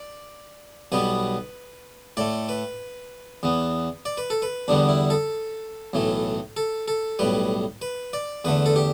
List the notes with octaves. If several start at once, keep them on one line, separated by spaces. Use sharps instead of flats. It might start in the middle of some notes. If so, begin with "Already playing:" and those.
Already playing: D5
B1 B2 G3 B3 B4
A2 A3 D5
B4
E2 E3 B3
D5
B4
A4
B4
E2 D3 G3 B3 D4
E4
A4
B1 A2 E3 A3
A4
A4
B1 A2 G3 B4
B4
D5
E2 D3 A3 B4
A4
G4